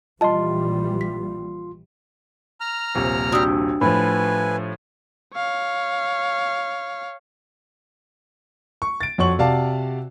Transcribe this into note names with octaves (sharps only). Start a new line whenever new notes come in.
A#1 E3 G3 F4 D#5 A5 C6
B6
A#5 F6
D#1 A#1 C3
G3 D4 F#4 D#6 E6
A2 F3 B4 G#5 B5
C#5 F5
C#6
A6 D7
F2 F#4 C#5 C#6 F#7
C3 F#4 D5 F5 A5